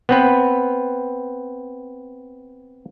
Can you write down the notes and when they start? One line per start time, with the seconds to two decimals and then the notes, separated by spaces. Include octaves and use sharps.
0.09 B3 C4 B4